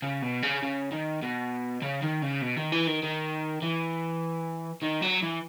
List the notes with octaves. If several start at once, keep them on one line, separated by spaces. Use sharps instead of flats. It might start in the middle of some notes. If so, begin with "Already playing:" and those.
C#3
B2
C#3
C#3
D#3
B2
C#3
D#3
C#3
B2
D#3
E3
D#3
D#3
E3
D#3
F#3
E3